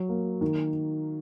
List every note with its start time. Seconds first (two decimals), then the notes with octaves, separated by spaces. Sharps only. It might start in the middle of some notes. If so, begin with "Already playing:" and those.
Already playing: F#3
0.09 A#3
0.41 D#3